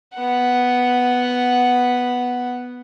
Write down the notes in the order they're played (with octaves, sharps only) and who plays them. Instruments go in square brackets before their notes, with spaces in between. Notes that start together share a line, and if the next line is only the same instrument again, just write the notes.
[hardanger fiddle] B3 F#5